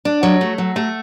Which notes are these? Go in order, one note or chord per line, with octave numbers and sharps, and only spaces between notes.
D4
F#3
A3
F#3
A3